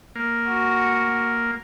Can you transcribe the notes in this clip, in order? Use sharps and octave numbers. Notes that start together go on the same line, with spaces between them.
A#3
F#4